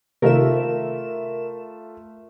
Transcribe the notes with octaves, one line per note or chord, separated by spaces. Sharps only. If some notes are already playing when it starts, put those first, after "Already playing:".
C3 D#3 A3 F4 A#4 E5 E7